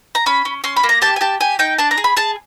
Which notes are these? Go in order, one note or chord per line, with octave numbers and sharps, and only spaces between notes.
A#5
C#4 B5
C#4
C#4 C6
B5
A#3
A#5
G4 A5
G#5
G4 A5
G4 G#5
D#4 G5
D4 A5
A#5
G#4
B5
G#4 A5